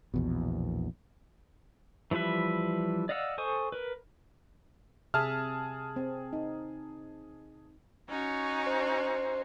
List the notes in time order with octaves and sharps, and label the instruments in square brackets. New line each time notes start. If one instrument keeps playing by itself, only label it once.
[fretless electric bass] A#1 E2 B2
[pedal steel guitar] E3 F3 G3 B4 E5
D5 D#5 F5 F#5 E6
A4 C5 G#5 C#6 D#6
A#4 B4
[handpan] C3 E5 [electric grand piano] G#4 A5 F6
[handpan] C4
D#4
[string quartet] C#4 D#4 F#4
[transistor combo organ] C5